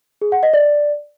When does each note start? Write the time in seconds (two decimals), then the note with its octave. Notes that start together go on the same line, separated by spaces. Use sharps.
0.21 G#4
0.32 F#5
0.43 D#5
0.53 D5